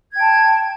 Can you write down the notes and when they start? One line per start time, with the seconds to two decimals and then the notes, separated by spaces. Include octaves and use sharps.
0.12 G#6
0.16 G5
0.20 A5